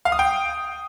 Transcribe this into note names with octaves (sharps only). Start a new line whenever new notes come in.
F5
D#6
G5